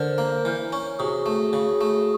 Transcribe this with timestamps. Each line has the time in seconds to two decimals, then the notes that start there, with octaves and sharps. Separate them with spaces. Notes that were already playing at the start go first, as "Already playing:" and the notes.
Already playing: D3 A#4 C5
0.18 A#3
0.45 E3
0.73 C#4
0.99 C3 F#4 G#4
1.26 A3
1.53 C#3
1.81 A3